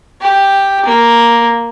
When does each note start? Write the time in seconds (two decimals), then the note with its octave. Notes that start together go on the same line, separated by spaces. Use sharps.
0.21 G4
0.86 A#3